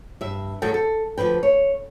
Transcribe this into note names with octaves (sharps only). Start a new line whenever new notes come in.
G2 E5
A2 D#3 F#3 A4 G5
A4
D2 F3 B4 G5
C#5